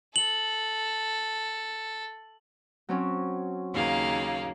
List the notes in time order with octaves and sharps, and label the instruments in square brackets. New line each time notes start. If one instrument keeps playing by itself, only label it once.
[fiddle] A4 [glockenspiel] F#7
[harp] F#3 C4 C#4
[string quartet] D#2 C#3 A#3 [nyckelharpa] F5